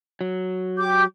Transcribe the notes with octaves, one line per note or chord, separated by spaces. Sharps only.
F#3
G4 D6 G6